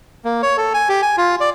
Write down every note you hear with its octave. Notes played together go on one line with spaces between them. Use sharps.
A#3
C#5
A4
G#5
G4
G#5
F4
D5